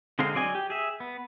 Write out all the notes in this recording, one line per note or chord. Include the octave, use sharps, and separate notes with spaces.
D3 G#3 C4 D#4 F5
F#3 D5 D#5 G#5
G4
G#4 E5
B3